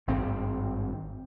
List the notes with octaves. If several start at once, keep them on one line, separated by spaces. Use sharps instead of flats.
G#1 G2 C4